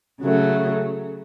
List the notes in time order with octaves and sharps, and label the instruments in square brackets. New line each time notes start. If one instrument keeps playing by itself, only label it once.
[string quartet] C#3 F#3 A3